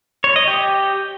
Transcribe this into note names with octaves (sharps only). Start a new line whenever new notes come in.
C#5
D#5
G4